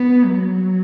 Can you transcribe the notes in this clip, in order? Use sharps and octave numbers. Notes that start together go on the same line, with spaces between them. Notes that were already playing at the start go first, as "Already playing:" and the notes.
Already playing: B3
F#3